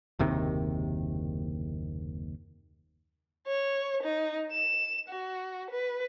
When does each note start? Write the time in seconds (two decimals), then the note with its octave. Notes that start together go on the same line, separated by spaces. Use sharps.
0.19 F#1 D#2 C3 D#3
3.47 C#5
4.03 D#4
4.52 E7
5.09 F#4
5.70 B4